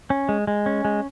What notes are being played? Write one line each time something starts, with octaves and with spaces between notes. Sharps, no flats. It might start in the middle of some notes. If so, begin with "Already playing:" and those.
C#4
G#3
G#3
C#4
G#3